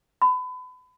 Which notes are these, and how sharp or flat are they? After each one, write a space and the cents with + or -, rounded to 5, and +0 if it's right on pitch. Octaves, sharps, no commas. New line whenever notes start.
B5 +30